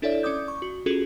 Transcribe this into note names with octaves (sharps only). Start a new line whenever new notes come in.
D4 E4 A4 C#5 D5 E5
C#4 D5 D6 D#6 G6
C#6
F#4
C#4 F4 F#4 G#4 A4